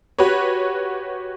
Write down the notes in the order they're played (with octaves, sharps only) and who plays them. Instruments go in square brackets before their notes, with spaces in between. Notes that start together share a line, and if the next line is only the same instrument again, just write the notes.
[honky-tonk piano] F#4 G4 B4 C#5